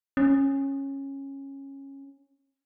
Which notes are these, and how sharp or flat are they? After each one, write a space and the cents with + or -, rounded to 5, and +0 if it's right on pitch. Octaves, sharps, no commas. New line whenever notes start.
C#4 -15